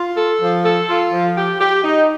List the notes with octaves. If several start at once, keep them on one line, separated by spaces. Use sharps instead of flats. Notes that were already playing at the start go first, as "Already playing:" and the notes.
Already playing: F4
A4
F3
A4
F4
F3
G4
G4
D#4